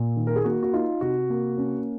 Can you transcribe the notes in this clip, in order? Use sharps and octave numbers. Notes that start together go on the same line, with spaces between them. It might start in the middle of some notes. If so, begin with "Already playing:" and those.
Already playing: A#2
D#3
A#4
G#4
A#3 F#4
F#4
D#4 F4
C3 F#4
A#3
C#4